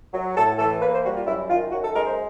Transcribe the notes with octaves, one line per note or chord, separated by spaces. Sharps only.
F#3
A2 A4
E3 A4
A#3 B4
C5
G3 F#4
F4
F#2 E4
D#3 F4
F#2 F#4
A4
G#3 A#4
C5